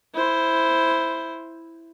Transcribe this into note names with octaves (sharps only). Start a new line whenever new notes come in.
E4 C5